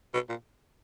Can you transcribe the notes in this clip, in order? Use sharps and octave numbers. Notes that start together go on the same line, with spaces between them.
B2
A#2